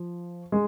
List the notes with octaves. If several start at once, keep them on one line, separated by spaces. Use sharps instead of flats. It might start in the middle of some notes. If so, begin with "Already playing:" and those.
Already playing: F3
G#3